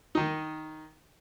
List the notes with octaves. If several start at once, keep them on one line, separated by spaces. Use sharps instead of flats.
D#3 D#4